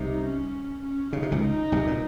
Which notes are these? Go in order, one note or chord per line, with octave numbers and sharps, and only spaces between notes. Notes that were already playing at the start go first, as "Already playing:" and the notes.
Already playing: C2 C3 D#4
C#4
C#4
C#3 D#4
C3
C#2 C#3
D#4
C2 C3
A#2